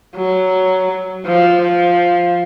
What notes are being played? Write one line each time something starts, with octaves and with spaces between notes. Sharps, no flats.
F#3
F3
F3